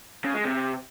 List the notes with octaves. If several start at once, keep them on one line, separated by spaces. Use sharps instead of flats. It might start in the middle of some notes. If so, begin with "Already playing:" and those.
C#3
G#3
C3